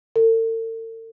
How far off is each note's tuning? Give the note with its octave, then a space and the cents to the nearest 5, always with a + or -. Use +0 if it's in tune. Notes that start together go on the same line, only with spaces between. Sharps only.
A4 +45